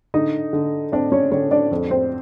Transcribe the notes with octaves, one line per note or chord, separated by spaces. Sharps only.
D3 D#4 D#5
D3
C4 D4 D5
C#4 C#5
D3 C#4 C#5
D4 D5
F2
C4 C5